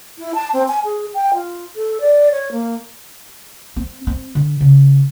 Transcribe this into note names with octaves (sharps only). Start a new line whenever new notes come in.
E4
A5
C4
G#5
G#4
G5
F4
A4
D5
C#5
A#3
C4
C4
D3
C#3